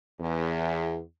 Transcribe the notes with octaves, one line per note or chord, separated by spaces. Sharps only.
E2